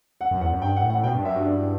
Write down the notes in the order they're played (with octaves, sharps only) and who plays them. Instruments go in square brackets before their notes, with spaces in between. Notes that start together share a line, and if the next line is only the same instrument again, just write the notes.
[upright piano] F#5
[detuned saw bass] F#2
[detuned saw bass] E2 [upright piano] F#5
[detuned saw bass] F#2
[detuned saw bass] G2 [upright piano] G5
[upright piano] F#5
[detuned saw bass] A2
[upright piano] F#5
[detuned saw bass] B2 [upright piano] G5
[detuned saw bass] G2
[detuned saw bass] F#2 [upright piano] E5
[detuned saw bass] G2 [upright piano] F#4
[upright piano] D4
E4